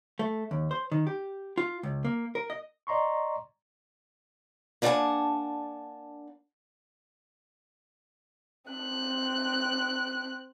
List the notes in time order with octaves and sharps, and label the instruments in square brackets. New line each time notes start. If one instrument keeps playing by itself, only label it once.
[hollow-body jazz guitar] A3
D#2
C5
D#3
G4
F4
C#2
A#3
A#4
D#5
[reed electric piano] D5 D#5 A#5 C6 C#6
[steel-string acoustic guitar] A#3 D4 D5 F#5 G#5 A5
[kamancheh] C4 F#6